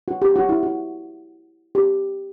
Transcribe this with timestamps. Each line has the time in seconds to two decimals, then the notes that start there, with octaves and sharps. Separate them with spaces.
0.08 F#4
0.22 G4
0.36 F#4
0.49 E4
0.63 F#4
1.75 G4